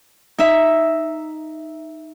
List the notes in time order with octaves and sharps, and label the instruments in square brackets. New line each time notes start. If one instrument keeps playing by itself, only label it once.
[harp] D#4 E5